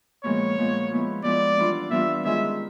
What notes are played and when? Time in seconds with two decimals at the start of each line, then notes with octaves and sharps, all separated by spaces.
0.24 A#2 F3 G#3 B3 C#5
0.58 A#2 F3 G#3 B3
0.91 F3 G#3 B3 E4
1.24 F3 G#3 B3 E4 D5
1.58 E3 G3 B3 D4 F4
1.90 E3 G3 B3 D4 F4 E5
2.24 D#3 G#3 C#4 F4 G#4 E5